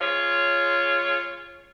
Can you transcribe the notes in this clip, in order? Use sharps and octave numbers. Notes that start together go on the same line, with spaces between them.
G#3 F4 C#5